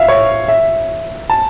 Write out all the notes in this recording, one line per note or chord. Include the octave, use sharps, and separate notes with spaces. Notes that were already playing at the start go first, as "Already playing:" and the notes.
Already playing: E5 F5
C#5
E5
A5